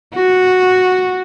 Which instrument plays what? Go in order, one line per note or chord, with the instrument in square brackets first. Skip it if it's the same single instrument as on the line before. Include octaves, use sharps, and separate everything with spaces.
[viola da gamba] F#4